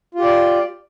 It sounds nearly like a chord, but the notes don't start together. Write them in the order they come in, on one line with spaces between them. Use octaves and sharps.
F4 G4 D5